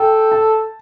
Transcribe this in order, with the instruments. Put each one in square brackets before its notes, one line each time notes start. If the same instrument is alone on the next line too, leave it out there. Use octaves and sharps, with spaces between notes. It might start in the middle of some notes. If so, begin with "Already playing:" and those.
Already playing: [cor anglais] A4 [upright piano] G5
[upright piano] A5